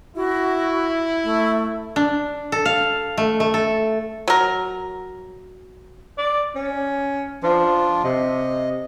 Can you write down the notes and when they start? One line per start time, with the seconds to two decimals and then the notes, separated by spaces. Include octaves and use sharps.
0.16 E4 F#4
1.24 A3
1.96 D4
2.52 A4
2.65 F5
3.18 A3
3.40 A3
3.54 A4
4.28 F#3 A#4
6.18 D5
6.55 C#4
7.43 F3 D4 F4
8.04 C3 D#5